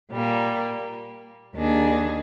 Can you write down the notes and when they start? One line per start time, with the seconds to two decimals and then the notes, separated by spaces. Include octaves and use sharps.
0.10 A#2 G3 A#3
1.53 D#2 D#3 A#3 D4 G#4